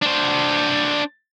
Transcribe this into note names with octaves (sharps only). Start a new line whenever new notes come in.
D4 C5